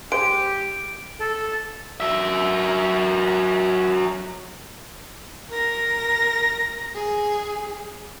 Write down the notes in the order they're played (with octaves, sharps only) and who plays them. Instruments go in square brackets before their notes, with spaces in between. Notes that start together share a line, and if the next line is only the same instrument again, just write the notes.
[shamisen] G#3 C5 [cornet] G4 [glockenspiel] D7
[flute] A4
[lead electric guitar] F#3 E5
[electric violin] A#4 A#6
G#4